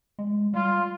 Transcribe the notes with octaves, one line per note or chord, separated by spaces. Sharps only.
G#3
G3 F4